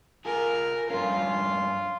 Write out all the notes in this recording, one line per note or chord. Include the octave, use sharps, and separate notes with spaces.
F4 G#4 A#4
G2 C#4 F4